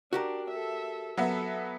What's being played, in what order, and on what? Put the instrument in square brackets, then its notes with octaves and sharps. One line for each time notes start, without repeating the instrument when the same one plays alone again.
[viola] D4 [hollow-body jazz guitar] F#4 G4 A#4
[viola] A4 E5
[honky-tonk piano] F#3 B3 E5 [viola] A4